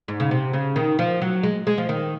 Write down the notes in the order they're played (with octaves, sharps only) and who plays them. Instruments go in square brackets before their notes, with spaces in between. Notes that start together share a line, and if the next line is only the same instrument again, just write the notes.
[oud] G#2
C#3
C3
C#3
D#3
F3
F#3
G#3
G#3
F3
D#3